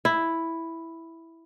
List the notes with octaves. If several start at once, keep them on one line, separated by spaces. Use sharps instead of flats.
E4